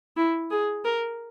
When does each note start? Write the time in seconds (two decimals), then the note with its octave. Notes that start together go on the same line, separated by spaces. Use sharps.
0.17 E4
0.51 G#4
0.84 A#4